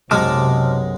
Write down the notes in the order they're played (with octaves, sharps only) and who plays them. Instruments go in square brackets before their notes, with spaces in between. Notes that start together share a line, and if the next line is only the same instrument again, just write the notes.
[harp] B1 F#2 C#5 [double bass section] C3 [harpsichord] G#3 [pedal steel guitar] A5 D6 F6